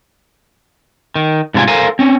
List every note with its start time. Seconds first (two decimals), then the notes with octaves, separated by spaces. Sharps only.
1.16 D#3
1.54 G#2 C3 D#3 D4 F4 G#5
1.68 A4 A#4 C5 F5 G#5
1.99 C4 C#4